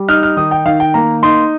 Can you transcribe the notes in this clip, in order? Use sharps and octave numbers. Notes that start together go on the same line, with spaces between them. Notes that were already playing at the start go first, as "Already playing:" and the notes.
Already playing: G3
D#4 F6
F6
D#3 D#6
G5
D#3 F5
G5
A#3 A#5
D#4 C6